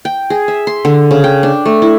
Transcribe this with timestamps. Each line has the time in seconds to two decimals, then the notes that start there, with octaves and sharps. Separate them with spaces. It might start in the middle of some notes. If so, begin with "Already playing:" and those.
0.05 G5
0.30 G#4
0.48 E5
0.67 C6
0.85 D3
1.11 C#3
1.24 G5
1.43 D4
1.66 A3
1.82 E4